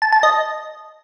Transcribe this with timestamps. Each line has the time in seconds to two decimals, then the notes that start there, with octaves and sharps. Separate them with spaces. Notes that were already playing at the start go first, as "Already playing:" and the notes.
0.02 A5
0.12 A5
0.23 D#5